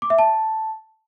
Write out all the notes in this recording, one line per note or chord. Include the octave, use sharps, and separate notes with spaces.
D6
E5
A5